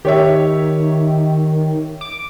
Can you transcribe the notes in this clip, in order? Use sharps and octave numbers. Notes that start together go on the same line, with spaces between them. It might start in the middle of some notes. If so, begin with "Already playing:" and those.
D#3 G4 C#5 E5
D6